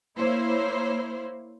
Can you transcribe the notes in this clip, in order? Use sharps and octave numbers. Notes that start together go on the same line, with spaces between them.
A#3 E4 C5 C#5